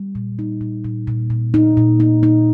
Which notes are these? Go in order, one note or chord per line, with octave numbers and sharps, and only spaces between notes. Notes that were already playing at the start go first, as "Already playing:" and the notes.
Already playing: G3
A#2
D#4
A#2
A#2
A#2
A#2
D#4
A#2
D#4
D#4